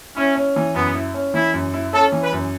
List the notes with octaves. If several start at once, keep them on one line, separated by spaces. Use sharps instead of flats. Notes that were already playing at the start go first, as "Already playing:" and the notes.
C#4 E4
C#4
E3
F#2 B3
E4
C#4
E3 E4
F#2
E4
C#4 A4
E3
B4
F#2